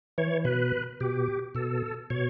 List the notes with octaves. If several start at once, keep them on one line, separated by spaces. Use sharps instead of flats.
E3 C#5
B2 B4
B2 G4
B2 A4
B2 C#5